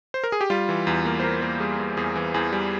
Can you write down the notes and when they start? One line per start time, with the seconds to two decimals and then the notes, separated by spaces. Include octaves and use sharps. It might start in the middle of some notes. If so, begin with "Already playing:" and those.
0.14 C5
0.24 A#4
0.32 G#4
0.41 G4
0.50 G3 F4
0.69 E3
0.87 E2
1.05 A#3
1.20 C5
1.24 A#3 A#4
1.42 A#3
1.60 G3 G#4
1.79 E2
1.97 E2 G#4
2.16 E3
2.34 E2 G#4
2.53 G3